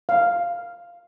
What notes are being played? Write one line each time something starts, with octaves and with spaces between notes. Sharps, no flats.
F5